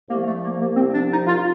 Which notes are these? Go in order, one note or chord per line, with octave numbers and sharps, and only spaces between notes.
C2 C3 F3 A3 A#3
A3
A#3
A#3
C2 C3 F3 C4
D4
D#4
F4